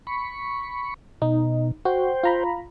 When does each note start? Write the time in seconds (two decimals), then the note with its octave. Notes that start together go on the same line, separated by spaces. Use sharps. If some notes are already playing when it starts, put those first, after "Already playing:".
0.07 B5 C#6
1.22 B2 D#4
1.85 F#4 C5 G5
2.24 F4 A#5 B5